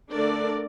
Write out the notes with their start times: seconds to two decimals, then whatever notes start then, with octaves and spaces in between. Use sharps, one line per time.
0.12 D3 A3 D4 A#4 D5